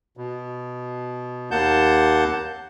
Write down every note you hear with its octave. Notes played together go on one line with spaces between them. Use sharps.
B2
D#2 A#3 F#5 A5 G6